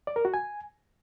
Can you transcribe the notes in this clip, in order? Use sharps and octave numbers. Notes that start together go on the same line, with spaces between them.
D5
A#4
F#4
G#5